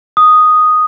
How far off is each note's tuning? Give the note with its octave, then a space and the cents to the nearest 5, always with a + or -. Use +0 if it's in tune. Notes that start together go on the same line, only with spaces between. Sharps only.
D#6 +0